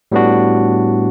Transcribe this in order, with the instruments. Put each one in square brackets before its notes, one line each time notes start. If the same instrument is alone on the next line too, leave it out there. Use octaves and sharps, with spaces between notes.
[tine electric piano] A2 G3 B3 D4 F#4